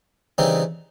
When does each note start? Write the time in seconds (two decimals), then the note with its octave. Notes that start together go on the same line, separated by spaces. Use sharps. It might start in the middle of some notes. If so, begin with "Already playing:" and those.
0.38 C#3 E3 G3 C4 D#4